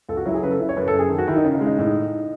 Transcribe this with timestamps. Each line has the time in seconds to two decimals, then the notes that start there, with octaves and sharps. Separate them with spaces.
0.09 C#2 A4
0.17 F#4
0.26 F#3 E4
0.34 G#4
0.43 C#3 B4
0.51 A4
0.60 C#3 E4
0.69 C#5
0.77 F#2 B4
0.88 A4
0.93 F#2
0.99 G#4
1.10 D#3
1.18 F#4
1.27 D#3 E4
1.36 D#4
1.44 C#3
1.55 D#4
1.61 G#3
1.67 D#4
1.78 A2 D#4